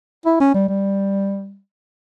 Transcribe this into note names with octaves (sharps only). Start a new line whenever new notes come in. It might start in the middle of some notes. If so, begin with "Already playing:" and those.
E4
C#4
G3
G3